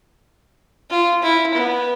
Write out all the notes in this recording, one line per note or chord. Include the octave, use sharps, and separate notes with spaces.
F4
E4
B3